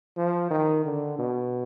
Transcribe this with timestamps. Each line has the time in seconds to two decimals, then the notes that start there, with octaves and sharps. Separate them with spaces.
0.17 F3
0.51 D#3
0.85 D3
1.19 B2